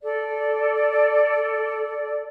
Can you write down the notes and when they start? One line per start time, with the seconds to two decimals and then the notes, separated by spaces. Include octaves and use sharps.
0.02 A4 D5